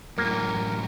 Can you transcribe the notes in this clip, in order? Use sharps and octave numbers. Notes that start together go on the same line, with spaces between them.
F#2 A2 A#3 A#4